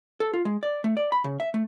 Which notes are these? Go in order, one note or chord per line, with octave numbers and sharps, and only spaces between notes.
A4
F4
G#3
D5
A3
D5
B5
C#3
E5
A3